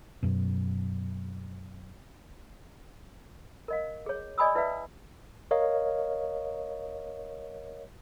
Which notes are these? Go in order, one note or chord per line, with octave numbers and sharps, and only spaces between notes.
F#2 B2
A#4 D#5 F5
G#4 C#5
D5 D#5 G#5 B5 D#6 E6
E4 B4 D5 E5 F5
A#4 C#5 D#5 F5